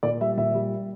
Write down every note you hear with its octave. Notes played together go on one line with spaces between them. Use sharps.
A#2 D5
G3 E5
A#2 E5
G3